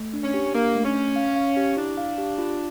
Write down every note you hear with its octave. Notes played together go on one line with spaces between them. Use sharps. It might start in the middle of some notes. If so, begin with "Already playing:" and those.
Already playing: A3
D4
C#4
G4
A#3 D4
A3
C#4
C#5
F5
F5
G4
D4 E4
F5
G4
F4